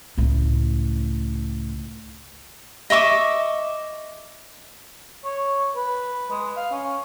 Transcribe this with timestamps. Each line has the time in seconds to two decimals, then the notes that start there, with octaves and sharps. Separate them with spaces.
0.18 C#2 A2
2.90 D#5 E5 C#6 D6
5.25 C#5
5.76 B4
6.31 G#3
6.57 F5
6.72 C#4